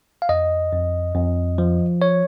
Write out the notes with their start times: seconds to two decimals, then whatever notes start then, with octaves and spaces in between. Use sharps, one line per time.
0.22 F5
0.29 F2 D#5
0.73 F2
1.15 F2
1.58 F3
2.02 C#5